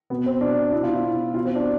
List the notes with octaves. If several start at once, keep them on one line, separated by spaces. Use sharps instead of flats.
B2 B3
C4
B2 D4
B2 E4
F4
E4
B2
B2 F4
C4
D4